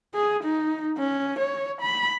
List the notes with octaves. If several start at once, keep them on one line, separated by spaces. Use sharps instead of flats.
G#4
D#4
C#4
C#5
B5